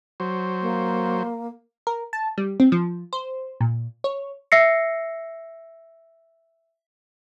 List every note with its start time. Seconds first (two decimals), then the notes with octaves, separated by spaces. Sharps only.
0.20 F#3 C5
0.61 A#3
1.87 A#4
2.13 A5
2.38 G3
2.60 C4
2.72 F3
3.13 C5
3.61 A#2
4.04 C#5
4.52 E5 E6 A#6 C7 C#7